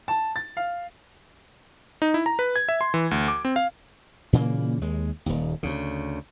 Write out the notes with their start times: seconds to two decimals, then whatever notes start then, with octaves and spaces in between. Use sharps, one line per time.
0.08 A5
0.36 A6
0.57 F5
2.02 D#4
2.14 E4
2.26 A#5
2.39 B4
2.56 G#6
2.69 E5
2.81 C6
2.94 E3
3.11 D2
3.28 D6
3.45 C4
3.56 F5
4.33 A#2 C#3 E3 A#3
4.81 D#2 G#3
5.26 D#1 D#2
5.63 D2 C#3